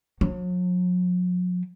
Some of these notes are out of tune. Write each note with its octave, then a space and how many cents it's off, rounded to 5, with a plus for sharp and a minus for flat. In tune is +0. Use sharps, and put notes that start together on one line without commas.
F#3 -45